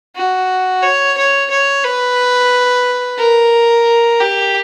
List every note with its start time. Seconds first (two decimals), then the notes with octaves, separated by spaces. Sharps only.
0.16 F#4
0.83 C#5
1.17 C#5
1.50 C#5
1.84 B4
3.19 A#4
4.21 G4